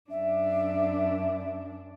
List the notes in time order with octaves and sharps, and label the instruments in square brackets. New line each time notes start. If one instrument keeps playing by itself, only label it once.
[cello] F#2 D4 [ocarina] E5